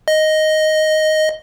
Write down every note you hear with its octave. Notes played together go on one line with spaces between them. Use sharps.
D#5